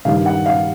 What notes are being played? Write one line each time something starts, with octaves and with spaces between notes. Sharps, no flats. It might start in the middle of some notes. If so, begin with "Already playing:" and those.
G2 D#3 G3 F5
F#5
F5